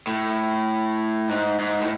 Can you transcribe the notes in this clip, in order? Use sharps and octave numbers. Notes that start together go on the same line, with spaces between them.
A2
G#2
G#2
A2